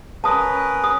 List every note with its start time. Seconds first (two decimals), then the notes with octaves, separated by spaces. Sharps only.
0.24 C#4 A#4 B4 A5 D#6
0.84 D#6